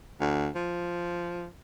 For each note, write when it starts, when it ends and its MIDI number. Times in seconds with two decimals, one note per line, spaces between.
0.20 0.48 38
0.55 1.47 53